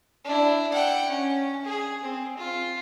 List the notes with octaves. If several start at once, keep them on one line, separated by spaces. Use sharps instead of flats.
D4 E4
F#5 G5
C#4
G#4
C4
F4